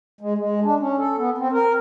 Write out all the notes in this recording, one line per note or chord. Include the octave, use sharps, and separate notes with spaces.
G#3
G#3
D4
C#4
A4
B3
C4
A#4